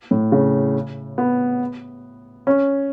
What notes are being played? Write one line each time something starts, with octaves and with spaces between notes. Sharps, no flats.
A2
C#3
B3
C#4